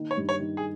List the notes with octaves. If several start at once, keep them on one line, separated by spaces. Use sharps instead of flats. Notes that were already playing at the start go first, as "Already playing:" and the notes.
Already playing: D#3 A#3
C#5
G2
C#5
D#3
G#4